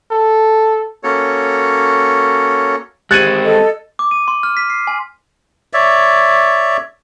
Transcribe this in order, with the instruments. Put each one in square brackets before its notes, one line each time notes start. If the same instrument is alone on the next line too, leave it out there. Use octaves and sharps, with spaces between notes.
[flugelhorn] A4
[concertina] A#3 C#4 F#4 A4 C#5
[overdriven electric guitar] G#3 C4 [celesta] G4 A6 C#7 [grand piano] F#6 G#6 D#7
[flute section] A4 D#5
[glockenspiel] D6
D#7
C6
F6
B6
C7
G#5
[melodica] C#5 D5 E5